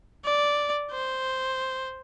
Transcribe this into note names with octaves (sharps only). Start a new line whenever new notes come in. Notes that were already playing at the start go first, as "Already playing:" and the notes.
D5
C5